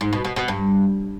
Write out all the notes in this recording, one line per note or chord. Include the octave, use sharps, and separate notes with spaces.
G#2
B2
B2
B2
G2